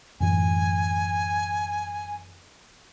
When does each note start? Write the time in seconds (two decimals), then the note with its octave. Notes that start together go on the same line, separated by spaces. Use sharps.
0.20 F#2 A2 E3 G#5